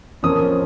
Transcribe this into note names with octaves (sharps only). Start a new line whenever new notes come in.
F2 F3 A#3 C#4 D#6